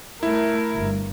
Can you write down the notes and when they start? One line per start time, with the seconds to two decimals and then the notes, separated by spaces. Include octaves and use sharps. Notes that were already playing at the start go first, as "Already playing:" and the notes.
0.23 A3 E4 A#4
0.75 G1